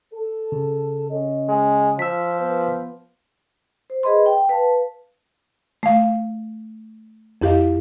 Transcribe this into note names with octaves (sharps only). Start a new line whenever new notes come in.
A4
C#3
C#4 D#5
G#3
F3 E6 B6
B3 B4
C5
G#4 B4 D#5 B5 C6
G5
B4 F5 A5
A3 F5
F2 E4 G4 D#5 F5